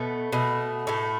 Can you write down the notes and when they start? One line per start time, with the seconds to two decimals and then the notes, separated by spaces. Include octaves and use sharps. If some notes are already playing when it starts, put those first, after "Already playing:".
Already playing: B2 A3 B3
0.32 B2 A3
0.87 A2 A3